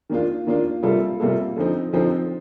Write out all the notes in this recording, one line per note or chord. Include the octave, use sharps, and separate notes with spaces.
D#3 A#3 D4 F4
D#3 A#3 D4 F4
C3 G3 A#3 F4 A4
C3 G3 A#3 F4 A4
D3 F3 C4 D#4
D3 F3 C4 D#4